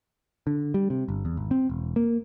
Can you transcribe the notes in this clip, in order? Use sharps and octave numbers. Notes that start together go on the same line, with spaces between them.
D3
G3
C3
G1
E2
G#1
C4
E1
A#3